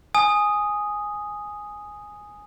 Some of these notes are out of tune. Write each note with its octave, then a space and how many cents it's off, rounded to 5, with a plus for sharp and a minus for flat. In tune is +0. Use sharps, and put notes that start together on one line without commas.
G#5 +0 D#6 +0